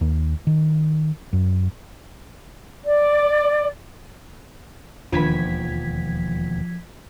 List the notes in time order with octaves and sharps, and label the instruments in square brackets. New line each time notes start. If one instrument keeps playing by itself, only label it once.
[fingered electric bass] D#2
D#3
F#2
[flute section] D5
[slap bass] E1 D#2 [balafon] D#3 D4 [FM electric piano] F3 G#6 B6